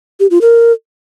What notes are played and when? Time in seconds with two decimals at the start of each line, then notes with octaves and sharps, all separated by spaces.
0.20 G4
0.31 F4
0.41 A#4